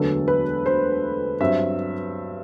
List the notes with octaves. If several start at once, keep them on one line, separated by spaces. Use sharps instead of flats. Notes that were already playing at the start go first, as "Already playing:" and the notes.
Already playing: E1 D2 D3 F#3 B3 A4
B4
C5
G2 F#3 C4 E5